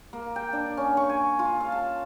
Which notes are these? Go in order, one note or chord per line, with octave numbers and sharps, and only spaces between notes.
A#3
G5
D4
C#4
C#6
G#5
F4
F5
A5